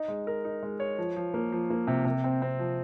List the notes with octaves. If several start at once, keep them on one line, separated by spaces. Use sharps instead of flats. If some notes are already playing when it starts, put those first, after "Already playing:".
Already playing: D#4
G#3
A#4
D#4
G#3
C#5
F3
F3
A#3
F3
A#3
C3
C3
C4
C4
F3